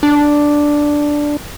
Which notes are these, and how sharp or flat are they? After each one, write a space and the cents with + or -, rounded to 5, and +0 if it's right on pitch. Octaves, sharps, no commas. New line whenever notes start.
D4 +0